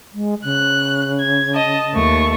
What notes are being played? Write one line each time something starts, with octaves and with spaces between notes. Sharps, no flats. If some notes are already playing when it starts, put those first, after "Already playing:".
G#3
C#3 F#6
G#6
D#5 A5
D#2 A3 C#6